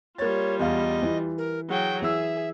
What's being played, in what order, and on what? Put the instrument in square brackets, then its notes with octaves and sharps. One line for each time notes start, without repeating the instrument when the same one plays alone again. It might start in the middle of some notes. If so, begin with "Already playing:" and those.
[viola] G3 F4 [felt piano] A#3 A6 [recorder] C#5
[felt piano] E2 F5 [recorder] D#5
[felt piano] E3
[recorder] A#4
[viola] F#3 G5 [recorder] G#4
[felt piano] E3 E6 [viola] G#4 [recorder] E5